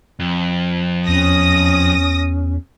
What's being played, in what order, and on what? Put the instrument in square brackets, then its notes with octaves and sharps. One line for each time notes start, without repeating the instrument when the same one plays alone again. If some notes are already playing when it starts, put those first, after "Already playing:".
[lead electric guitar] F2
[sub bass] E2 [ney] C#4 [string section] D#6 A#6